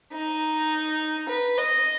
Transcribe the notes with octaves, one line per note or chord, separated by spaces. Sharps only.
D#4
B4
D#5